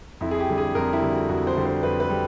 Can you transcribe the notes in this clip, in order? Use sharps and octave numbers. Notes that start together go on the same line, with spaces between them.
F2 E4
G#4
G4
D3 G3
G#4
F2 A#4
E4
D3 G3
F#4
F2 F#4
C5
D3 G3
C5
F2 B4
B4
G3